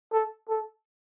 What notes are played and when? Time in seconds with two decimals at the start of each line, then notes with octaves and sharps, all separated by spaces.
0.13 A4
0.49 A4